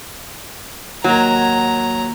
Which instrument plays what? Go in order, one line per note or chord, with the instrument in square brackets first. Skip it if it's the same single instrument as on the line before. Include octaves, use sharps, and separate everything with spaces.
[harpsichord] D#2 D#3 [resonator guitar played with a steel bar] F#3 [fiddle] A#5